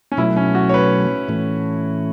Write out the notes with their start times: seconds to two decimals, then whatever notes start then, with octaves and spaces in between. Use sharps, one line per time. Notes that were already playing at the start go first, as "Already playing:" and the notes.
0.12 C#4
0.17 B2 F#3 A3 E4
0.36 C#4
0.55 F#4
0.69 C#5
0.74 B4
1.28 A2 E3 A3 C#4